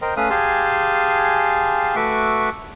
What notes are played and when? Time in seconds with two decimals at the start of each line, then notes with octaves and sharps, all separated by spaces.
0.02 A#4 C5 D#5 G5
0.17 A3 C#4 B4 F5 D#6
0.30 G4 G#4 F5 G#5 A5 C6
1.96 A3 F#4 B4 E5 C#6 D6